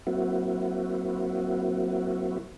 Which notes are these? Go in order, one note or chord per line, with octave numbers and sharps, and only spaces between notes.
F#3 A#3 C4 E4 F#4